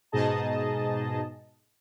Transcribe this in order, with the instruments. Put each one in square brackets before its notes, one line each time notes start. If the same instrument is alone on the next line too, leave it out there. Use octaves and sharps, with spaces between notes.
[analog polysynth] G#2 B2 D#4 G#4 D#5 A5